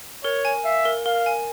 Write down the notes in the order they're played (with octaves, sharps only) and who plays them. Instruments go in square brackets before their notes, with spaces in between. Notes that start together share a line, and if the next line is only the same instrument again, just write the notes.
[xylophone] A#4 [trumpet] C#5
[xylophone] G#5
[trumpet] E5 [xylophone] F5
[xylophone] A#4
[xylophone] A#4 [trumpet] F5
[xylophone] G#5